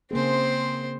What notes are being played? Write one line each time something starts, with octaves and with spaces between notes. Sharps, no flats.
C#3 A#3 C4 G#4 C5